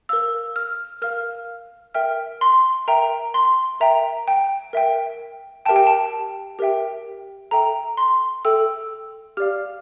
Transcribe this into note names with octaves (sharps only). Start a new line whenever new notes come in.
A#4 F5 E6
F6
A#4 F5 F6
A#4 E5 G5 F6
C6
A#4 E5 G5 A#5
C6
A#4 E5 G5 A#5
G5
A#4 E5 G5
G4 A#4 E5 G5 A5
G5
A5
G4 A#4 E5 G5
A4 E5 G5 A#5
C6
A4 E5 G5 E6
G4 D5 F5 F6